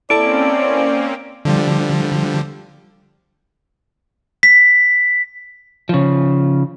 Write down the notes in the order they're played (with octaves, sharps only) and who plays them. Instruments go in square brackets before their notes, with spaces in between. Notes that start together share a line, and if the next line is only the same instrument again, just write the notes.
[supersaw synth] A#3 C4 C#4 [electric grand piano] E4 A4 A5 [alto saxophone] D5 [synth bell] D7
[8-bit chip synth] D3 F3 G3
[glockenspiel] B6
[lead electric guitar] C#3 F3